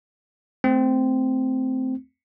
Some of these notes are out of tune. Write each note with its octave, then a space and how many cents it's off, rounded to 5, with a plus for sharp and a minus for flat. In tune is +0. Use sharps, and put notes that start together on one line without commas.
A3 +0 C4 -10